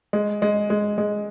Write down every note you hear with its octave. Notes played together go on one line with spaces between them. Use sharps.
G#3
G#3
G#3
G#3